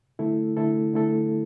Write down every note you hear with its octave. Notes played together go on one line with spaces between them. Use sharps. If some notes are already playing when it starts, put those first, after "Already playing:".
D3 A3 E4 A4
D3 A3 E4 A4
D3 A3 E4 A4